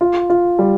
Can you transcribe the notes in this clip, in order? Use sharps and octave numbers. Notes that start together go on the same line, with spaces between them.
F4
F4
G3